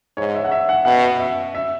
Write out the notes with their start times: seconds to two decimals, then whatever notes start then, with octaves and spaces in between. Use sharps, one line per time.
0.17 G#2 C#5
0.34 E5
0.45 F#5
0.52 E5
0.69 F#5
0.85 B2 F#5
1.20 E5
1.55 E5